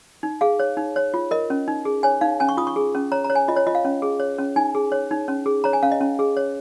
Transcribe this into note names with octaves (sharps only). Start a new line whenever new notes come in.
D#4
G#4 F5
C#5
D#4
C#5
F4
A#4 D#5
C#4
D#4
G#4
C#5 G#5
D#4 F5
C#4 G#5
C#6
F4 D#6
C#6
G#4
C#4
C#5 A#5
A#5
C#5
G#5
F4 D#5
C#5
F4 D#5
F5
C#4
G#4
C#5
C#4
D#4 G#5
G#4
C#5
D#4
C#4
G#4
C#5 A#5
G#5
C#4 F5
D#5
C#4
G#4
C#5